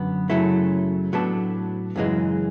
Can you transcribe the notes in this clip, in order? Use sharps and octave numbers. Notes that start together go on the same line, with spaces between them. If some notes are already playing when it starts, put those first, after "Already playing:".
Already playing: F#2 D3 F#3 B3
F#2 C#3 F#3 A3 E4
A2 F#3 B3 D4 A4
F#2 C#3 E3 G#3